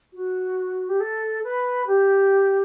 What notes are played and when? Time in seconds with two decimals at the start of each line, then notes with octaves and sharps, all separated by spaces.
0.13 F#4
0.89 G4
1.00 A4
1.43 B4
1.87 G4